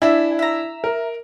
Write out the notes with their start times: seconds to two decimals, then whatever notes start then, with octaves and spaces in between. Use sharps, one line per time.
0.02 D4 E4 E5 G#5
0.39 E5 A#5
0.84 A#4